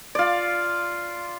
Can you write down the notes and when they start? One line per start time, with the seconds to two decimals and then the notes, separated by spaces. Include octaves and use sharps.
0.15 F4 D5